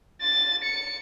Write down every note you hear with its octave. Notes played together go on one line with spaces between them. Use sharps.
A6
C#7